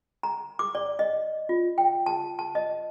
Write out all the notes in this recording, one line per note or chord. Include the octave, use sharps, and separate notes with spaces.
A#5
D6
D5
D#5
F4
G5
A5
A5
D#5